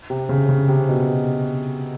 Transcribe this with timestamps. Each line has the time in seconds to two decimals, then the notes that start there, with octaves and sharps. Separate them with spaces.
0.10 C3
0.29 C#3
0.49 C#3
0.68 C3
0.89 B2